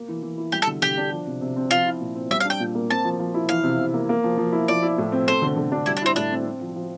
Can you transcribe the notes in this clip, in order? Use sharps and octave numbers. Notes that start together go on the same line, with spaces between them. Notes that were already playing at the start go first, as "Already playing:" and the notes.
Already playing: A#3
E3
E3
E4
G3 G4
A4
D3
D3 G4
D4
F3
C3
C3
C4
F3 F4
E4
A#2
C4
G3 E5
F5
D4
G5
A#2
A#3
C4 A5
F3
F3
E4
E3 F5
C3
C3
A#3
A#3
F3
F3
E4
F3 D5
E4
A2
C4
A3 C5
D3
D3
D4
G3 E4
D4
C4 E4
A2 D4
C4
C4
F3
F3